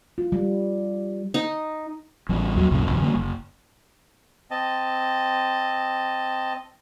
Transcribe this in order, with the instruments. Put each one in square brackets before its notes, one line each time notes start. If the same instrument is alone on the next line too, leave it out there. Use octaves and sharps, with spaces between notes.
[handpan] F4
G3
[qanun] D#4
[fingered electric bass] A1 G3
D#2 F#3
C2 F#2 A#2 C#3
F#1 B1 E2
D3 G3 A3 A#3
F#1
[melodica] C4 D#5 A5